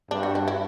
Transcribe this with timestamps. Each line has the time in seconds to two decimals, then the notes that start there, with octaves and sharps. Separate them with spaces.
0.11 G2 D4
0.23 F#4
0.35 F#4
0.48 E4